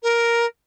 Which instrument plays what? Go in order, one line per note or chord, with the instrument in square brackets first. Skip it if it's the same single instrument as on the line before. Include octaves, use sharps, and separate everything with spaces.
[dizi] A#4